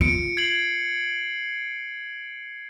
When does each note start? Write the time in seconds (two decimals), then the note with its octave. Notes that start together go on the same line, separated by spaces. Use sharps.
0.01 F4 C#7 D7
0.37 G#6 C7 F#7